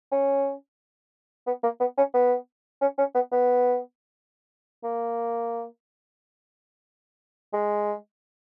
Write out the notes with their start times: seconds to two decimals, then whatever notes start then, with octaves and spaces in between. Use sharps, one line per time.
0.12 C#4
1.47 B3
1.63 A#3
1.80 B3
1.97 C#4
2.14 B3
2.81 C#4
2.98 C#4
3.15 B3
3.32 B3
4.84 A#3
7.53 G#3